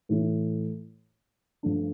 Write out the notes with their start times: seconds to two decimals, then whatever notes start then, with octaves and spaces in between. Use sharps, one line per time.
0.09 A2 E3 A3 E4
1.63 G2 F3 A3 D4